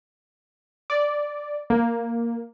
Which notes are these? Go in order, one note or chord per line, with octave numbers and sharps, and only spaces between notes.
D5
A#3